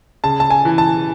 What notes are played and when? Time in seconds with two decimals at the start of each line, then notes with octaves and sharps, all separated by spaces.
0.24 C#3 A5
0.40 A5
0.50 G#5
0.65 E3
0.78 A5